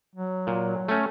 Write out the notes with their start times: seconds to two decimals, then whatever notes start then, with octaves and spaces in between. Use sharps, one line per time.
0.15 F#3
0.47 A#2
0.88 A3 C#4